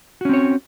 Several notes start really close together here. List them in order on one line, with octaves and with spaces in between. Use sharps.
F#4 C#4 C4 C#5